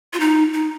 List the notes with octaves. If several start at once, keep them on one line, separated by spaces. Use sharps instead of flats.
F4
D#4
D#4